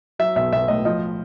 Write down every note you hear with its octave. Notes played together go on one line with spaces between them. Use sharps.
F#3 E5
B1 E5
B1 E5
A2 D#5
F3 D#5